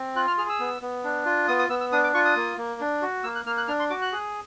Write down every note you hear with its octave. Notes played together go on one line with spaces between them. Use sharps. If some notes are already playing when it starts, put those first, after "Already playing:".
Already playing: C4
F4 F#6
F6
G#4 F6
E6
B3
B3
D4
F4
B3 D#6
D#6
B3 E6
E6
D4 D#6
D6
F4 C#6
D#6
A#3
A#3
D4
F#4
A#3 E6
F#6
A#3 F6
F#6
D4 F6
C6
F#4 D6
F#6
G#4